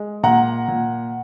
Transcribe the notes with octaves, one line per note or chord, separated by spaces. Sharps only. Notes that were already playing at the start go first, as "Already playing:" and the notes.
Already playing: G#3
A#2 F#5 A#5
A#2